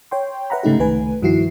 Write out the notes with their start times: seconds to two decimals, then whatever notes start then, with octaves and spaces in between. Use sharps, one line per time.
0.11 C#5 G5 C6
0.50 B4 E5 F#5 A#5 B5
0.63 G#2 C#3 A3 D#4 G4
0.79 C2 D#3 A3 B4 G#5
1.22 G2 D#3 F3 E4 F#4 C7